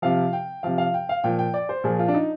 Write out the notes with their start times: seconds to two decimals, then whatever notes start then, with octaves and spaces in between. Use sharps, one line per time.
0.02 C3 F3 F5
0.33 G5
0.63 C3 F3 F5
0.78 F5
0.94 G5
1.09 F5
1.24 A#2 F3 G5
1.39 G5
1.54 D5
1.69 C5
1.84 A#2 F3 G#4
1.99 F4
2.08 D4
2.14 D#4